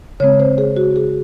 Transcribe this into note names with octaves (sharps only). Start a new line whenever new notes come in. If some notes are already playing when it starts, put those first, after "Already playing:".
C#3 G#3 C4 C#5
C5
G#4
F#4
G#4